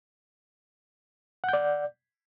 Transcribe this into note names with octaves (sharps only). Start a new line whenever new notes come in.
D5 F#5 G6